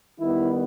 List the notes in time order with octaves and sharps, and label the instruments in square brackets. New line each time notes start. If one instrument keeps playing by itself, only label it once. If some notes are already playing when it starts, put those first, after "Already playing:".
[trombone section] D#3 G3 B3 E4